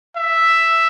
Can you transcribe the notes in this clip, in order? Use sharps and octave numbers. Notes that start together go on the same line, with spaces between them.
E5